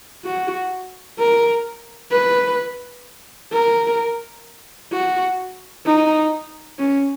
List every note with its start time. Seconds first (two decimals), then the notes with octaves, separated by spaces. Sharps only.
0.25 F#4
1.19 A#4
2.12 B4
3.52 A#4
4.92 F#4
5.86 D#4
6.79 C#4